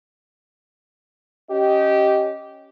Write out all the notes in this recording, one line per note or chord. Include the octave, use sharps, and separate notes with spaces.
C#4 G4 D#5